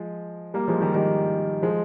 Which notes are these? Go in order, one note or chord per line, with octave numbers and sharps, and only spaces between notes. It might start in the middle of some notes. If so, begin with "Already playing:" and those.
Already playing: F3 G#3
G3 A#3
F3 G#3
D#3 G3
D#3 G3
F3 G#3